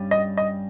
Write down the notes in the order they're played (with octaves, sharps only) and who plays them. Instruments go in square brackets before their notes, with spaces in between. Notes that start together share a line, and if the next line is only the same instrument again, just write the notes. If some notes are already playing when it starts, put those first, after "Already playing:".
Already playing: [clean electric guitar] G2 G3 C#4
[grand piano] D#5
D#5